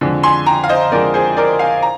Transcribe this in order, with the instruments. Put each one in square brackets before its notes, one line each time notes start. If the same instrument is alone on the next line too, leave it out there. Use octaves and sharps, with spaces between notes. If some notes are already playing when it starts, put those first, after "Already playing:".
[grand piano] F2 D3 G#3
G#5 C6
G5 A#5
F5
C5 D#5
F2 D3 G#3 A#4 D5
G#4 C5
A#4 D5
F5 G#5
A#5